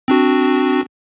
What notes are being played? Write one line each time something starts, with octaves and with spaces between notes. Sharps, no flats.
C4 D4 F#4